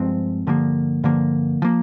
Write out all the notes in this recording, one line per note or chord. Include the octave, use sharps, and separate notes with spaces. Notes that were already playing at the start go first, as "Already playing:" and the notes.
Already playing: G2 F3 G#3 C4
G2 D3 F3 A#3
G2 D3 F3 A#3
F3 A#3